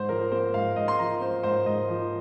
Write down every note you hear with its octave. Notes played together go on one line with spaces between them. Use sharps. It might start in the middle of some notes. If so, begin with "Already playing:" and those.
Already playing: G#2 C5
F3 A#4
A#3 C5
G#2 F5
G#2 D#5
C6
F3 A#5
A#3 C5
G#2 C5
G#2 D#5
F3